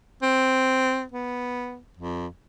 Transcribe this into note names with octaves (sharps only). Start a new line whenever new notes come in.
C4
B3
F2